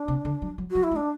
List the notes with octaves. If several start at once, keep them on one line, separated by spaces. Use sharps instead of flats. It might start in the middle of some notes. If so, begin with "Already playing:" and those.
Already playing: D4
C3
D3
F#3
F#3
F#3 F#4
E4
A3
D4